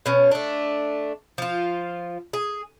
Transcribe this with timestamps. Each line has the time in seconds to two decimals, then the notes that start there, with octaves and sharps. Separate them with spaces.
0.06 B2 C#4 C#5
0.31 A3 D4
1.38 F3 F4
2.33 G#4